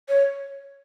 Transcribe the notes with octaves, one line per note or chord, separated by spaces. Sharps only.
C#5